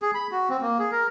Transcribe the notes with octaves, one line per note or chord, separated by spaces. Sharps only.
G#4
B5
F#4
C4
A#3
G#4
A#4